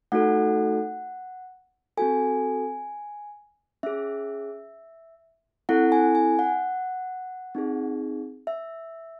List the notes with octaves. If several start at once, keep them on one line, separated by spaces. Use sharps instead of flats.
A3 D#4 F#4 A4 F#5
C4 F#4 A4 G#5
C#4 G#4 E5
C4 E4 A4 F#5
G#5
G#5
F#5
C4 D#4 G#4
E5